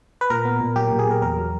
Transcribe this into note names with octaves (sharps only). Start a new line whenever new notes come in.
B4
A#2 A#4
B3
A#2
F#3 G4
A#2
G#4
A#2 A#4
E2 A#4
F#3